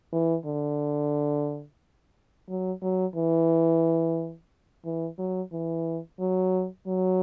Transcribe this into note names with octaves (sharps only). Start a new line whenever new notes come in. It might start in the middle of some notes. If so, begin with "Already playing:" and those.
E3
D3
F#3
F#3
E3
E3
F#3
E3
F#3
F#3